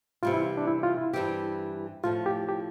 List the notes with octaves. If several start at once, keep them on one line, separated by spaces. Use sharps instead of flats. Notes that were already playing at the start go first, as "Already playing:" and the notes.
C3 E3 G3 F4
E4
D4
E4
F4
E4
G2 E3 G3 C4 G4
A2 F3 A3 F4
G4
G4